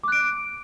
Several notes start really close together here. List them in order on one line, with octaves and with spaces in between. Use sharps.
D6 F#6 D7